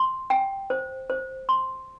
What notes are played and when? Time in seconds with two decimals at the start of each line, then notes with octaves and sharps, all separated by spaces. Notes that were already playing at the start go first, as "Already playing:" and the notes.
Already playing: C6
0.30 G5
0.70 C5
1.10 C5
1.49 C6